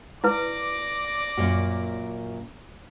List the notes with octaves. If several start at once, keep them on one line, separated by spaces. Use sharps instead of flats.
E4 B4 D5 D6 A#6
F#2 A#2 F#4